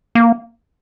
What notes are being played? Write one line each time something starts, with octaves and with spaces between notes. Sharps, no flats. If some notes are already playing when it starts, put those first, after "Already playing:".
A#3